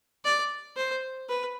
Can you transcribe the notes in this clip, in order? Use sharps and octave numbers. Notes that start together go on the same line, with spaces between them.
D5
C5
B4